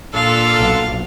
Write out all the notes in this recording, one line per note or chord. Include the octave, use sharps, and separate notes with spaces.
A#2 D4 F4 A4 F5
B1